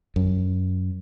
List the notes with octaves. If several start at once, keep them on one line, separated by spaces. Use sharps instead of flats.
F#2